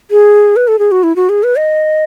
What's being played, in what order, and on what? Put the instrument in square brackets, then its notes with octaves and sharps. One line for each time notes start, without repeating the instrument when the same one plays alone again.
[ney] G#4
B4
A4
G#4
F#4
E4
F#4
G#4
B4
D#5